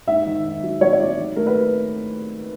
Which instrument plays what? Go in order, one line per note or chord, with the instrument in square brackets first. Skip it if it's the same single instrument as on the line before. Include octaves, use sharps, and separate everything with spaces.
[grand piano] G#2 [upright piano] E5
[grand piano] D#3
G#2
F#3
[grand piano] F#3 [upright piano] C#5
[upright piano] C#5
[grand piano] F#3 [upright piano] D5
[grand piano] D#3
[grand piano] A3 [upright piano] A#4
[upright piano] B4